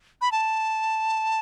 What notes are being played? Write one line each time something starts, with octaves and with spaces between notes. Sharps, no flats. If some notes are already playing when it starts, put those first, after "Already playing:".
B5
A5